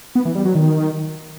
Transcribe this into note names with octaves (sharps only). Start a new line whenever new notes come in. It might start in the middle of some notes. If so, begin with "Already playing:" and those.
B3
E3
G3
F#3
D#3